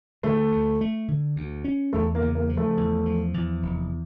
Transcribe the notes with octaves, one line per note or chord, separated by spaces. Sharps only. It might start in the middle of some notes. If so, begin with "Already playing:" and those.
D3 A3
D2
A3
D3
D2
C#4
E2 A3
A#3
C#3
A#3
F3
A3
E2
F3
E2
F1